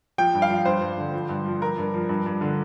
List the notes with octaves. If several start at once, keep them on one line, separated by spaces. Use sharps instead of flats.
F3 G5
G2
F5
F3
G2 C5
G2
D3
F3
G2
F3
F3 A#4
G2
F3
G2
G2
D3